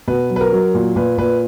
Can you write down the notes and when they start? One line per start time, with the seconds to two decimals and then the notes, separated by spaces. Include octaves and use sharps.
0.08 B2 B4
0.30 F#3
0.36 B4
0.41 A#4
0.52 F#3
0.75 A#2
0.96 A#2 B4
1.18 A#2 B4